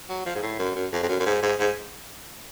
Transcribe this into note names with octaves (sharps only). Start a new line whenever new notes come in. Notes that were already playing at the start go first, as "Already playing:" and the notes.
F#3
F3
G#2
A2
F#2
F#2
F2
F2
F#2
F#2
G#2
G#2
G#2